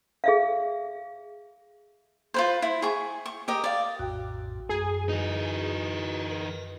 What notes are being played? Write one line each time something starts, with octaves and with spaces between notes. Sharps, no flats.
G#4 E5 F5
F4 B4 C5
E4
G#4 C#6
C#6
G4 A#4 D#5
D5 F5
A#1 F2 A2 F#4 G5
F#2 G#3 G#4
E3 D#4 E4 F#4 B4
A#4 B4